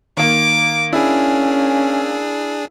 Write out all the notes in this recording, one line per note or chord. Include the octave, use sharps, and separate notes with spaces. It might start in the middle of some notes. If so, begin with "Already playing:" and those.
D#3 A#3 D6
A#3 C#4 D4 E4 G#4